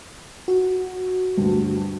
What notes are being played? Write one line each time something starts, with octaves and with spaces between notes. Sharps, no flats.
F#4
D2 G2